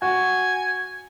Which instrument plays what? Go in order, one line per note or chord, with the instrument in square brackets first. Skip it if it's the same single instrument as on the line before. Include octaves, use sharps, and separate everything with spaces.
[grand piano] F#4 [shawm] G#5